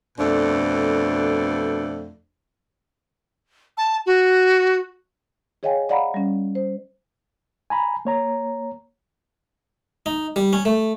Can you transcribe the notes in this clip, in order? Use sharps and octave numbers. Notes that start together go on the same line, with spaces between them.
F2 B2 A3 D4
A5
F#4
G#4 C#5 D#5 F5 G5 G#5
D5 D#5 F5 F#5 A#5 B5
G3 C#4
C5
G#5 A#5 B5
A#3 C#5 A#5
D#4
G3
C#4
A3